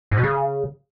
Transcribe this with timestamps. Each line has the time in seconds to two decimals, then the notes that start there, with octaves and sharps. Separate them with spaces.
0.11 G#2
0.17 B2
0.23 C#3